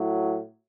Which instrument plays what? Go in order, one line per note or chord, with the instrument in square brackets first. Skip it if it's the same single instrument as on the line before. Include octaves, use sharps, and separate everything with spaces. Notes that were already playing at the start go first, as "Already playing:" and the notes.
Already playing: [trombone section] A2 F#3